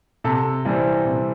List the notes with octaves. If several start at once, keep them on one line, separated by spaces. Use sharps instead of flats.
C3 A4
E3 G3 C4
C3